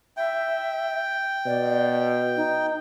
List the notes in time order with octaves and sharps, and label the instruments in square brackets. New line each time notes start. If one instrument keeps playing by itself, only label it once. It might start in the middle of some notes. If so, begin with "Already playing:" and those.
[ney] E5 [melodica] G5
[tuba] B2 [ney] D5
[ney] D#4